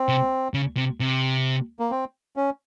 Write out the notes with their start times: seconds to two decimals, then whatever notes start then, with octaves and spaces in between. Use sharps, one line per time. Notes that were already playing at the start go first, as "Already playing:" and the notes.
Already playing: C4
0.09 C3
0.54 C#3
0.77 C3
1.00 C3
1.79 A#3
1.91 C4
2.36 C#4